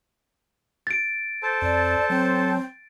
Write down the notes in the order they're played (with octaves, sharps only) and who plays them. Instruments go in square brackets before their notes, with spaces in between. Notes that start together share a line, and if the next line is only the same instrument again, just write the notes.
[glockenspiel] A6 D7
[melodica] A4 C5 A5
[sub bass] F2 [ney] D5
[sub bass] F#3 [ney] C4